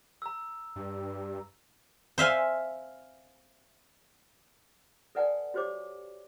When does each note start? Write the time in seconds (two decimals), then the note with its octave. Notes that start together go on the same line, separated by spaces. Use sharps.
0.22 A#5 E6
0.76 G2
2.18 C5 E5 F5 G#5
5.15 A4 B4 D5 F#5 G#5 A5
5.54 F#4 G4 C5 C#5 D6